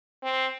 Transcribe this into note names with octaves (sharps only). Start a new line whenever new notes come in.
C4